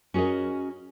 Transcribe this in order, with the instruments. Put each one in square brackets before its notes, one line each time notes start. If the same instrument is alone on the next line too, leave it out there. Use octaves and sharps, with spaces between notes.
[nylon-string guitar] C#4 F#4 G#4 A#4 D#5